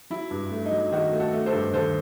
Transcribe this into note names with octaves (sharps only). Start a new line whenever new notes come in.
F#3 E4
G2
A3
D#4
F#3
D#3 D#4 F#4
A3
F#4 A4
A3
A4 C5
G2
D#2 A4 C5